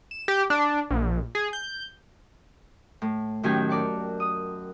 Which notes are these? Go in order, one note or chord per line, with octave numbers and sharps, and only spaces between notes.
E7
G4
D4
A#1
G#4
G6
A2
F#2 A2 D#3 C#4 G4 G#5
A#4 D5 A5 C#6
D#6